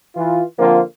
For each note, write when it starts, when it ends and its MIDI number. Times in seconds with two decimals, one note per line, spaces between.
0.16 0.42 52
0.16 0.42 65
0.58 0.80 50
0.58 0.80 53
0.58 0.80 58
0.58 0.80 60
0.58 0.80 65